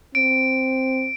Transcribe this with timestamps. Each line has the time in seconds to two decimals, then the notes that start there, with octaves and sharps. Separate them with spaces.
0.15 C4 D7